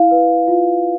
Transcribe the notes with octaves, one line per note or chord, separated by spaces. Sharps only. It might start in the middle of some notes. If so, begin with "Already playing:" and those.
Already playing: E4 F5
B4
F4